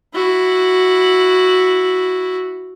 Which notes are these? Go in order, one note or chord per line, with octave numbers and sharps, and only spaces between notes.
E4 F#4